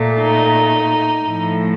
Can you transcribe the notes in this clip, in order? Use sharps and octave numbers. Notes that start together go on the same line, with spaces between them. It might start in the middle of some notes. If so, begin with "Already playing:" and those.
Already playing: A#2 A3
D#4
A2 F3 A3